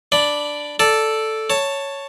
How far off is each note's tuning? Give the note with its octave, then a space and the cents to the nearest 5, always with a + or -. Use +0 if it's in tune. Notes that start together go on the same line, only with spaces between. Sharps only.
D4 +0 D5 +0 B5 +0
A4 +0 D5 +0 A5 +0
C#5 +5 A5 +10